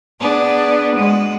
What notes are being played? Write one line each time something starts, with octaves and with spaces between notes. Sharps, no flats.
B3 D4 G#4
G#3 F#4